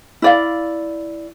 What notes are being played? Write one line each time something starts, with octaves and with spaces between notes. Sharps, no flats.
E4 D5 F5